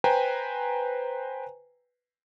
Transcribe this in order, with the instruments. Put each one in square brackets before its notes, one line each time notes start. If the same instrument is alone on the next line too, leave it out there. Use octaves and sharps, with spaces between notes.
[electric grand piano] B4 C5 G5 G#5 A#5